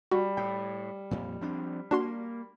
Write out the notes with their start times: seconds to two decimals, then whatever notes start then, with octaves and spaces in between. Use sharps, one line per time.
0.11 G3 F#4
0.37 A2 G5
1.11 F2 A#2
1.41 F3 C4 D4
1.91 A#3 D4 F#4 C6